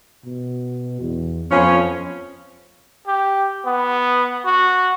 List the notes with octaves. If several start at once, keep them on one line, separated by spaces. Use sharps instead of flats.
B2
E2
F2 F3 B3 C#4
G4
B3
F#4